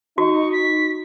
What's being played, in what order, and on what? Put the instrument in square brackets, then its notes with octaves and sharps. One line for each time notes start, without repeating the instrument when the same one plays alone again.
[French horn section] D#4 [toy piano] F#4 [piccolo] C#6
[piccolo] B6